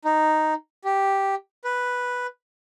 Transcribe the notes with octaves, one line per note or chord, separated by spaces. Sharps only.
D#4
G4
B4